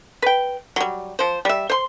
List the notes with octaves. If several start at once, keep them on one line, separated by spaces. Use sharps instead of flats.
B4 G5
F#3 G3
F3 C5
G3 E5
C5 C6